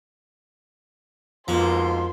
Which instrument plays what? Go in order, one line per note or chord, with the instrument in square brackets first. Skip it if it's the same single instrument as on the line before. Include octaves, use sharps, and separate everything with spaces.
[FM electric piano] F2 B3 [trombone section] G#2 B2 A#3 [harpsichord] F3 [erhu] C6